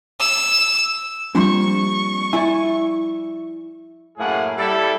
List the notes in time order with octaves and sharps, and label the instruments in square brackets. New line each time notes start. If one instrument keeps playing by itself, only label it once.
[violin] E6
[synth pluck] F3 G3 [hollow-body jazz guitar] A#3 C4 D4 [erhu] C#6
[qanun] E4 D5 [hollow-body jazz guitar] E5 G#5
[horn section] F#2 A2 A3 A#3 G#4 F#5
G3 E4 A4